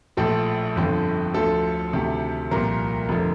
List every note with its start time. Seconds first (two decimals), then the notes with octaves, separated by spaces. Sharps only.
0.17 A#1 A2 F3 A4
0.76 G1 F2 D3 F3
1.34 D2 D3 F3 A4
1.93 D2 C3 D#3
2.51 C2 A#2 F3 A#4
3.09 F1 D3 F3